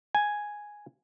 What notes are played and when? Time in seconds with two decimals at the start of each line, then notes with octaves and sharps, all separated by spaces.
0.15 G#5